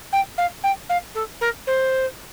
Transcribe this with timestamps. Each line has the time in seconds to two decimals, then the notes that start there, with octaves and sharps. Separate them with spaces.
0.13 G5
0.38 F5
0.63 G5
0.89 F5
1.15 A4
1.41 A#4
1.67 C5